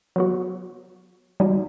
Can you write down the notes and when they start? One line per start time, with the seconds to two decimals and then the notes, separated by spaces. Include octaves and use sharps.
0.16 F#3 B3 F#4
1.40 G3 D#4 F#4